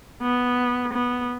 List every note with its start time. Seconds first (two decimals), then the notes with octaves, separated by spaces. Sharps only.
0.22 B3
0.93 B3